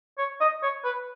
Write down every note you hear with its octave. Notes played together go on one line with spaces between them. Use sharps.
C#5
D#5
C#5
B4